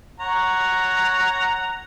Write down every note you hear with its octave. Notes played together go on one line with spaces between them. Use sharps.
C#5 F#5 A#5